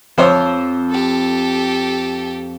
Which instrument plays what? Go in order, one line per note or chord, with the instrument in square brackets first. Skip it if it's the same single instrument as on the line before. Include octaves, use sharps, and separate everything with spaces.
[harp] F2 D6 E6 [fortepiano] F3 C5 C#5
[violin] G4 A4